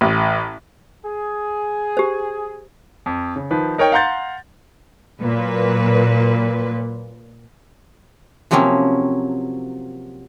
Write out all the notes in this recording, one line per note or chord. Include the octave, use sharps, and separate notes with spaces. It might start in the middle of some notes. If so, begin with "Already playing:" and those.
A1
G#4
G4 C5
F2
C#3
D#3 F3 B4
D#4 A#4 C#5 G5
F5 F#5 A#5 C6 G6 A6
A#2 F#3 B4
C3 F3 F#3 A#3 C4 C#4